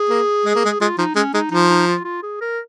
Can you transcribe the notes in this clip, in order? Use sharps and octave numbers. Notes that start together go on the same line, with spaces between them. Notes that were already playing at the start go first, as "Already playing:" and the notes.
Already playing: G#4
A#3
G#3
A#3
G#3
G#3 F4
F3 D#4
G#3 C#4
G#3 D#4
F3 D#4
D#4
F4
F4
G#4
A#4